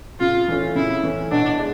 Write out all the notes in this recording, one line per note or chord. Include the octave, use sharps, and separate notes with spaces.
C#3 F4
E3 A3 C#4
C#3 E4
E3 A3 C#4
B2 D4
G#3